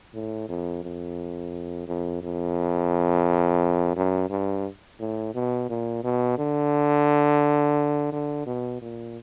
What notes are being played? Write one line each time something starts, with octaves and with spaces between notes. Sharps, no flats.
A2
F2
F2
F2
F2
F#2
G2
A2
B2
A#2
B2
D3
D3
B2
A#2